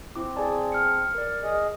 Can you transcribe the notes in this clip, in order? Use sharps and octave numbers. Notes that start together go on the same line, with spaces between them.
C4 E4 D6
G#4 D5 G#5 A5
F6 C#7
A#4 D5
G#4 D#5